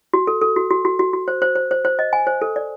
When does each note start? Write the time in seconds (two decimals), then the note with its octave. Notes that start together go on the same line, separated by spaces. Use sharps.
0.14 F#4
0.27 A4
0.41 A4
0.56 F#4
0.71 F#4
0.85 F#4
0.99 F#4
1.13 F#4
1.28 C5
1.42 C5
1.55 C5
1.71 C5
1.85 C5
1.99 D#5
2.13 G#5
2.27 C5
2.42 A4
2.56 D5